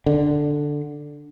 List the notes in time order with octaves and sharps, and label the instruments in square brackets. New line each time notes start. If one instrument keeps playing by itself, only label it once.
[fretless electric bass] D3